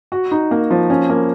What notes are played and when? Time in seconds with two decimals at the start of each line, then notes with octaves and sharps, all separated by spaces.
0.12 F#4
0.31 D#4
0.51 A#3
0.71 F3
0.90 C#4
1.09 A#3